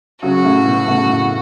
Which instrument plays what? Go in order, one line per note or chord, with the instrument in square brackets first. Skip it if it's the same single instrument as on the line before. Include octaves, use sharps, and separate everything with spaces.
[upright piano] C#3 F#3 [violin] F#4
[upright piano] A2 C#3
B2
A2 C#3
A2